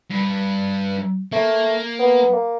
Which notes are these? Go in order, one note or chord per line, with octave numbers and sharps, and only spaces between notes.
G2
A3 A#3
B3
A#3